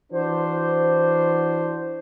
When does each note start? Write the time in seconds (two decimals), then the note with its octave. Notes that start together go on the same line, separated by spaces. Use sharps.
0.13 E3 D4 F#4 C5